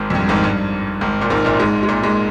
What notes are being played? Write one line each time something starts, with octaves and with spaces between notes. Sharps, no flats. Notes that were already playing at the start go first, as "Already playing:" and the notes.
Already playing: G#1 G#2
F2
G2
G#1 G#2
G2
G#1 G#2
A#2
G#1 G#2
A#1 A#2
G#2 G#3
G#3
A#2 A#3
G#2 G#3